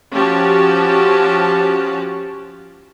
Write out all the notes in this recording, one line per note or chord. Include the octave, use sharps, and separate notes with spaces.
F3 C#4 F#4 G4 A5